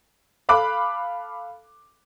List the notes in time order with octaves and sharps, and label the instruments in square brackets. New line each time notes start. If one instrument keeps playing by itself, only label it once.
[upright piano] A4 F5 B5 D6 F#6